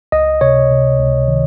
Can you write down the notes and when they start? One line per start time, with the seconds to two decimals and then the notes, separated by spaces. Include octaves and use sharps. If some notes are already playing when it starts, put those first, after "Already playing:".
0.12 C#2 D#5
0.41 C3 C#5
0.71 C3
0.99 C#2
1.28 D#3